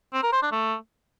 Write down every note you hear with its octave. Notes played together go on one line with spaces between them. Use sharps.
C4
A#4
C5
D4
A3